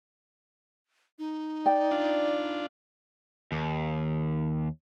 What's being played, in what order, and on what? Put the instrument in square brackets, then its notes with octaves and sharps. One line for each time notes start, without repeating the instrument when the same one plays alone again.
[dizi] D#4
[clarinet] D5 [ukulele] G5
[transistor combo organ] D4 F4
[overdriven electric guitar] D#2